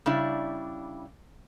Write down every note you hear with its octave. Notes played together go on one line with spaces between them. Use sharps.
C#3 G3 D4 E4